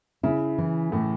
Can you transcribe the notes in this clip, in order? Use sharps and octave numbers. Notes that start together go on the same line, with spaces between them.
C#3 E4
E3
A2 E3